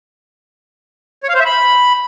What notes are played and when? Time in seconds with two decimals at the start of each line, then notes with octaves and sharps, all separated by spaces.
1.24 C#5
1.29 F5
1.35 C5
1.40 E5
1.45 B5